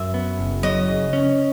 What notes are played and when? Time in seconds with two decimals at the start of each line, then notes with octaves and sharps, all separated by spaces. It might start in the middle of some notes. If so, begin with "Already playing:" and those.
Already playing: F#2 E5
0.14 B3
0.39 F#1
0.63 F#3 D#5
0.88 C#3
1.13 C#4